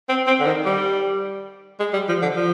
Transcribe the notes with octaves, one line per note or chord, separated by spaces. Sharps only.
C4
C4
D3
D#3
G3
G#3
G3
F3
D3
F3